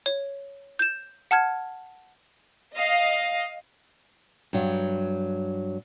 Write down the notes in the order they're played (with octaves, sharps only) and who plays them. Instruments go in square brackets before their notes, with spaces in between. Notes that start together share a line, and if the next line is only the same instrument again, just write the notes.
[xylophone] C#5
G6 E7
F#5 A5 F6 G#6
[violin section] D#5 F5
[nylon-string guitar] G2 F#3